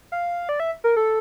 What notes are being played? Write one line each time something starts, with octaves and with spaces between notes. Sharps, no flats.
F5
D5
E5
A#4
A4